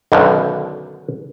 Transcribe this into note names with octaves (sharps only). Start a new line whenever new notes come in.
B1 F#2 B2 D3 D#3